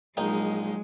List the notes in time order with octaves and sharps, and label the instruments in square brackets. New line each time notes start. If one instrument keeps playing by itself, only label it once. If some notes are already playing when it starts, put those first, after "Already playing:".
[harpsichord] A#1 D#4 G5 [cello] F#3 G#3